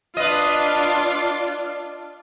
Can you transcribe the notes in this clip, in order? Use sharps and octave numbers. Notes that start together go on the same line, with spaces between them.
D4 F4 B4 D#5